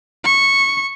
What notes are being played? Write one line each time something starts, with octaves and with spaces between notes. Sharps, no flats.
C#6